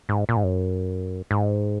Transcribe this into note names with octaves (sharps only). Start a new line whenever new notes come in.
G#2
A#2
G#2
F#2
G#2